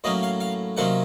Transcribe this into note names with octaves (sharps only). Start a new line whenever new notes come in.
A2 F#3 A#3 C#4 D#5
F5
F5
C3 D#3 F#3 A#3 C#4 F#5